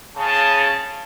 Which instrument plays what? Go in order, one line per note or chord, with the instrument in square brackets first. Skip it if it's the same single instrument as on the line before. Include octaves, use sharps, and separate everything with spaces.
[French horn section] C#3 [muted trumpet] A5